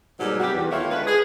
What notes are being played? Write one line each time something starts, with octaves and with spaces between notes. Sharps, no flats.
G#2 B2 F#3 G3 A#3
C3 G3 F#4 G4
E2
D#3 A3 E4 F4 C#5
D3 G#3 B4
G#4